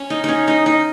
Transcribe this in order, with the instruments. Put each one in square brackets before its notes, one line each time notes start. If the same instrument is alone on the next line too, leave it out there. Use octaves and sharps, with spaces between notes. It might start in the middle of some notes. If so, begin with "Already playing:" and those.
Already playing: [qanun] C#4
D#4
C#4 D#4
D#4
D#4